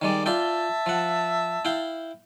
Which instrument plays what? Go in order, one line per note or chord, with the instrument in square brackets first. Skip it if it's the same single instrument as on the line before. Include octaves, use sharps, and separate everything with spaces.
[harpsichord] D#3 G3 G#3 [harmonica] D5
[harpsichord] F4 D5 G5 [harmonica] E5 A5
[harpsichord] F3 F#5
E4 F5 G5